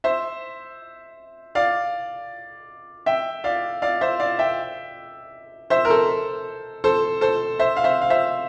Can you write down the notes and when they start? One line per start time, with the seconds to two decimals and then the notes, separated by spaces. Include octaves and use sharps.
0.04 C5 E5
1.55 D5 F5
3.06 E5 G5
3.44 D5 F5
3.82 D5 F5
4.01 C5 E5
4.20 D5 F5
4.39 E5 G5
5.70 C5 E5
5.85 A#4
5.90 A4 C5
6.84 A4 C5
7.21 A4 C5
7.59 C5 E5
7.77 F5
7.84 C5 E5
8.01 F5
8.10 C5 E5